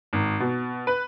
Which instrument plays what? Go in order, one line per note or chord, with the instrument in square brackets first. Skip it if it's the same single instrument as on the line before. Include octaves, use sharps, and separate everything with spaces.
[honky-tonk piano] G#1
B2
B4